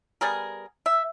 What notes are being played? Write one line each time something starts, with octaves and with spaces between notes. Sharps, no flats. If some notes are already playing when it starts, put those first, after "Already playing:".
G3 B3 G#4 A#4
E5